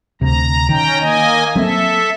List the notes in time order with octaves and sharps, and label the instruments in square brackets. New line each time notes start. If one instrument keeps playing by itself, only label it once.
[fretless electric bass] D2 C3 [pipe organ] A#5
[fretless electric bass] D#3 [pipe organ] C#4 G5 A#5
[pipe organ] A#3 D#5 G#5
[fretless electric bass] F#3 A#3 C4 [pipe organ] A4 E5